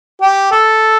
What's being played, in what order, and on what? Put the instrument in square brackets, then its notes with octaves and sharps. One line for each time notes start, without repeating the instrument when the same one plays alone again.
[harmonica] G4
A4